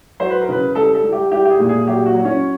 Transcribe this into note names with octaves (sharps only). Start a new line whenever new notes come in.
F#3 C5
B4
A#4
C#3 B4
G3 A4
A4
G3
G4
G3 G4
G4
G#4
A#2
G#4
F#3 G4
F#4
F#3
C#4